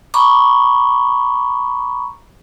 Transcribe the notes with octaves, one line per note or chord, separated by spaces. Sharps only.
A#5 B5 C#6 D6